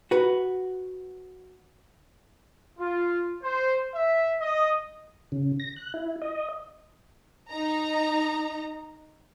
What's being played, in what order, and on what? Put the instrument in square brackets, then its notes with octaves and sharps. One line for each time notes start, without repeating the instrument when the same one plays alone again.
[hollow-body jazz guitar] F#4 B4
[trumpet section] F4
C5
E5
D#5
[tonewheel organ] C#3
A#6
F#6
E4
D#5
[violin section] D#4 A#5